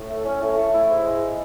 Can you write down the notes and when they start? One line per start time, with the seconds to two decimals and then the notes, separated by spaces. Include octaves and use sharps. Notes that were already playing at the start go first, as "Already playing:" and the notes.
Already playing: A2
0.09 A3
0.25 C#4
0.41 A2
0.57 A3
0.73 E4
0.89 G#2
1.05 G#3